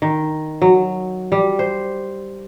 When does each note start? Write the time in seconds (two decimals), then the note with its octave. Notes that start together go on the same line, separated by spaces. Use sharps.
0.02 D#3
0.62 F#3
1.32 G3
1.59 C5